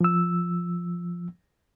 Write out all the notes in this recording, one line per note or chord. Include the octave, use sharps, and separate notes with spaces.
F3 E6